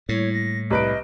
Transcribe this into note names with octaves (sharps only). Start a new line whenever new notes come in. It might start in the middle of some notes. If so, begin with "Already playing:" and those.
A2 G3 A#3 E4 C#5
A#6
C2 B4 D#5 D7